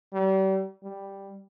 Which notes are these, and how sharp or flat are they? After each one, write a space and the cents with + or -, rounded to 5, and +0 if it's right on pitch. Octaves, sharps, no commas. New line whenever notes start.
G3 -35
G3 +5